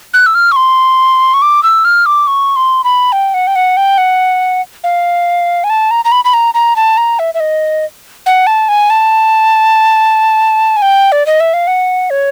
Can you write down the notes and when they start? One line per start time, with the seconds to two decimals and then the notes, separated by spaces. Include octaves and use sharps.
0.14 F#6
0.26 E6
0.35 F6
0.52 C#6
0.56 C6
1.34 C#6
1.42 D6
1.63 E6
1.85 F6
2.06 D6
2.27 C#6
2.56 C6
2.84 B5
3.12 G5
3.34 F#5
3.47 G5
3.56 F#5
3.77 G5
3.98 F#5
4.84 F5
5.64 G#5
5.70 A5
5.91 A#5
6.05 A#5
6.12 B5
6.25 B5
6.34 A#5
6.54 A#5
6.76 A5
6.97 A#5
7.19 E5
7.34 E5
7.40 D#5
8.26 F#5
8.47 A5
8.69 G#5
8.90 A5
10.77 G#5
10.82 G5
11.12 D5
11.26 D#5
11.40 E5
11.54 F5
11.67 F#5
12.10 C#5